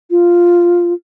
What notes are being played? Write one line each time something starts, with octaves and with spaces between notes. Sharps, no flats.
F4